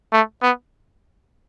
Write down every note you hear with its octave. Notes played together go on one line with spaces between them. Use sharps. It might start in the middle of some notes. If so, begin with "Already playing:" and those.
A3
B3